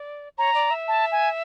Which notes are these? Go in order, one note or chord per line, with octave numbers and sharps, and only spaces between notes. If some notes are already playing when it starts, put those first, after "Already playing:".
Already playing: D5
C#5 A#5
D5
E5
A5
G#5